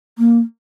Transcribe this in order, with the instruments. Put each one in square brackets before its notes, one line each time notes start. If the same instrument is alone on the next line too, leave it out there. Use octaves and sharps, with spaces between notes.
[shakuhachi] A#3